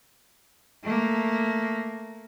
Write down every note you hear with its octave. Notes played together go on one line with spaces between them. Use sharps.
A3 A#3